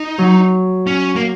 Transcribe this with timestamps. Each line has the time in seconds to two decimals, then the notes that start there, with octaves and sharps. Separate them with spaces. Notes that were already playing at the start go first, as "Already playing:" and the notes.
Already playing: D#4
0.18 F#3
0.87 C#4
1.16 A#3